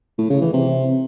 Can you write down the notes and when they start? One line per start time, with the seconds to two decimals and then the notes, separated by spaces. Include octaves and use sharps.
0.18 A2
0.30 C#3
0.42 E3
0.53 C3